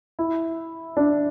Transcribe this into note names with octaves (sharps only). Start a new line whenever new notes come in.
E4
D4